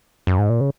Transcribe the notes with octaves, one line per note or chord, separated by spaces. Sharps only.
F#2
G#2
A#2
C#3